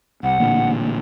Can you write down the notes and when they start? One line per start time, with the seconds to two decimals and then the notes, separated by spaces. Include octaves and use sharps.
0.23 C2 F#5
0.38 A1 A#2 D3